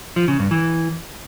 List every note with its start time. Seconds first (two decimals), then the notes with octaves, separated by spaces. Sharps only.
0.16 F3
0.28 C#3
0.39 G2
0.51 E3